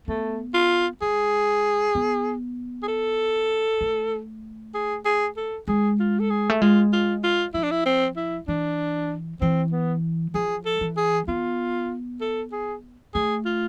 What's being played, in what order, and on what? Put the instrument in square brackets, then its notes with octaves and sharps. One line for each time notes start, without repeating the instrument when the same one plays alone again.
[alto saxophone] A3 [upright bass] B3
[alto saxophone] F4
[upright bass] G#3 [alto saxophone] G#4
[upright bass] B3
[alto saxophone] G#4
A4
[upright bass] A3
[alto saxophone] G#4
G#4
A4
[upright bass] G#3 [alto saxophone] G#4
[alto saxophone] F4
A4
G#4
[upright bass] A3
[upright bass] G#3 [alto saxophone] F4
[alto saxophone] F4
F4
[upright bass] F3 [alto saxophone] E4
[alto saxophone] D4
E4
C4
E4
[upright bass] E3 [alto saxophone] D4
[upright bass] E3 [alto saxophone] C4
[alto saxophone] B3
[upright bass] F3 [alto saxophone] G#4
[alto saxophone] A4
[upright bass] E3
[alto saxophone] G#4
[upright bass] B3 [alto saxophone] F4
[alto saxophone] A4
G#4
[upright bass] A3 [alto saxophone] G#4
[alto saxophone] F4